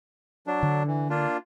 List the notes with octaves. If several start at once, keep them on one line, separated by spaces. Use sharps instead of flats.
F#3 D4
D3
E3
A#3 D4 F4